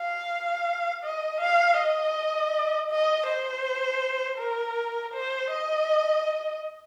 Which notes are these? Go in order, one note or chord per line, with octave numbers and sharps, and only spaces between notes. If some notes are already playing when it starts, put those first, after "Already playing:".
Already playing: F5
D#5
F5
D#5
D#5
C5
A#4
C5
D#5